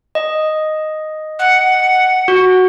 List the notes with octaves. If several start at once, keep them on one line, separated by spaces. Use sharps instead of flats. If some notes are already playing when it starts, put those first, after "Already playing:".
D#5
F#5
F#4